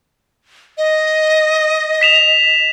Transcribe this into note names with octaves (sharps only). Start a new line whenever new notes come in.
D#5
B6 E7 F7